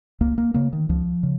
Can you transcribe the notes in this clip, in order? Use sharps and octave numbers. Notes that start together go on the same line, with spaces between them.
C#2 A#3
A#3
C#3 A#3
D#3
C#2 F3
C#3